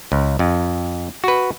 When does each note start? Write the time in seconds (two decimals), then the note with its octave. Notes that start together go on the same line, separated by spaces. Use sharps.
0.12 C#2
0.39 F2
1.24 F#4 B4